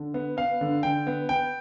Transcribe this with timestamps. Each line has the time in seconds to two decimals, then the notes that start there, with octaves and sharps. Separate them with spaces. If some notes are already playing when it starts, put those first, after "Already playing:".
Already playing: D3
0.14 B3
0.37 B3 F5
0.61 D3
0.83 D3 G5
1.07 B3
1.29 B3 G5